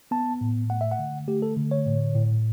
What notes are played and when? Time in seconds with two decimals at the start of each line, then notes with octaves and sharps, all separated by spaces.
0.11 B3 A5
0.41 A2
0.70 A3 F#5
0.81 E5
0.92 F#5
0.99 D3
1.28 A3 G4
1.42 A4
1.57 D3
1.71 C#5
1.86 A2
2.15 A2